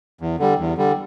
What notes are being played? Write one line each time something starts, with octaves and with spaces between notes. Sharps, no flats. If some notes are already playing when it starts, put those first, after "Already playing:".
E2
D3 G3
E2
D3 G3